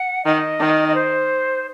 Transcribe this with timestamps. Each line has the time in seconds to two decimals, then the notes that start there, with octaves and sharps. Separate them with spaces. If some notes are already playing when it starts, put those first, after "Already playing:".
Already playing: F#5
0.25 D#3 D#5
0.60 D#3
0.89 D#5
0.95 C5